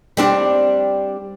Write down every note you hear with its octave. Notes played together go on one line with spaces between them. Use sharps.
G3 C4 D4